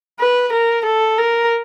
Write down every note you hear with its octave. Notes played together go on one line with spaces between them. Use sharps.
B4
A#4
A4
A#4